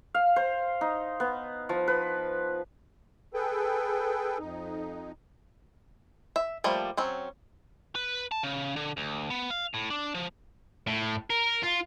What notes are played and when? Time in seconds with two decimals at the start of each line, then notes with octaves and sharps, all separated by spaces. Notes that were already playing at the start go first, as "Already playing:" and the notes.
0.14 F5
0.36 C5
0.81 D#4
1.20 B3
1.69 F3
1.88 B4
3.34 G#4 A4 B4 G5
4.39 F2 D#4
6.36 E5
6.64 F3 G3 A3 A#3
6.97 F#3 C4 C#4
7.95 B4
8.31 A5
8.43 C#3
8.76 D3
8.97 D2
9.30 B3
9.50 F5
9.74 A2
9.90 D4
10.15 F3
10.87 A2
11.30 A#4
11.63 F4